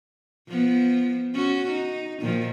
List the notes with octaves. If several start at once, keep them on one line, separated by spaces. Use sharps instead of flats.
F3 B3
C#4 F#4
D#4
A#2 D#3 F3